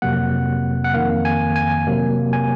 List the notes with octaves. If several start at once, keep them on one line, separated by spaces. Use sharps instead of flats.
F2 C3 F#3 A#3 F#5
F#5
F2 D#3 A#3 F5
G#5
G#5
C3 F#3 A#3
G#5